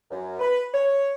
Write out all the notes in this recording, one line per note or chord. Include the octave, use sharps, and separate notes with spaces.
F#2
B4
C#5